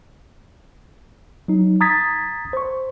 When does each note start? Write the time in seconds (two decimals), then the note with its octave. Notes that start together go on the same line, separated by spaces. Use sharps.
1.48 F#3 D#4
1.81 A#5 D#6 G#6 A6 B6
2.53 C5 C#6